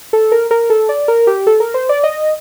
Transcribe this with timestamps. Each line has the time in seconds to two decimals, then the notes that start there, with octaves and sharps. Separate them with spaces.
0.13 A4
0.32 A#4
0.51 A#4
0.70 A4
0.89 D5
1.08 A#4
1.27 G4
1.47 A4
1.60 A#4
1.74 C5
1.89 D5
2.04 D#5